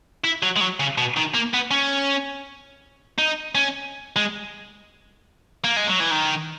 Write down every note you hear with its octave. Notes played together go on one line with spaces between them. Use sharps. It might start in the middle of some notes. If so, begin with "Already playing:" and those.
E4
F#3
G#3
F#3
C#3
B2
D#3
A#3
B3
C#4
D#4
C#4
G#3
A#3
G#3
F#3
E3
D#3